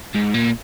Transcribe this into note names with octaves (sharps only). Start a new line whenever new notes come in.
G#2
A#2